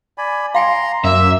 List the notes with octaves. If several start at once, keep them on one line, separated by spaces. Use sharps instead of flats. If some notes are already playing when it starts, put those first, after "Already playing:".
D5 G#5 B5
F5 G5 G#5 A#5 C6
F#2 A#3 E5